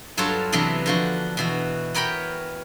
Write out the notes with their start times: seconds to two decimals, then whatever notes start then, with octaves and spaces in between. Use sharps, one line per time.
0.17 G2 F#3 F4 A4 C#5 A5
0.52 C3 E3 F#3 B3 D4
0.86 D3 F3 F#4
1.37 B2 E3 F#4
1.94 B3 A#4 C#5 G5 B5